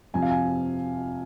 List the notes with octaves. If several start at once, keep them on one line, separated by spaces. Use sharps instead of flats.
F2 C3 F3 G#5
F5
G#5